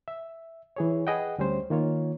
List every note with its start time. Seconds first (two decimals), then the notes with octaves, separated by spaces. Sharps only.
0.08 E5
0.76 E3 G#4 C#5
1.07 G#4 B4 D#5 F#5 G5
1.38 D2 G3 C#4 C5
1.70 D#3 A#3 F4 C#5